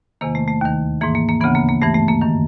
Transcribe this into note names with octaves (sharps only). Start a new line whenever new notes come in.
E2 C3 D#3 A#3
A3
A3
D#2 D#3
G#2 E3 A#3
A#3
A#3
D2 C#3 E3 B3
A#3
A#3
G2 E3 A3
A3
A#3
F#2 D#3